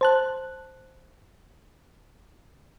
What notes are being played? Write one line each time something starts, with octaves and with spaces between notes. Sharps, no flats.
C5 A5 F#6